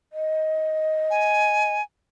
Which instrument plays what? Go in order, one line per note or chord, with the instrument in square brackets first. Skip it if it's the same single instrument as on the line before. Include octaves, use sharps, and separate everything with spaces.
[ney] D#5
[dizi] G#5